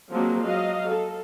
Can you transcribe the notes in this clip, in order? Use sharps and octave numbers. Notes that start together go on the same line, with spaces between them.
F3 F#3 G#3 A#3 C4
F#3 D#5 F5
A4